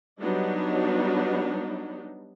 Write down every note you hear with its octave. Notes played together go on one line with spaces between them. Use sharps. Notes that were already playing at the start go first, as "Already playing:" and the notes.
F#3 G3 B3 D4 D#4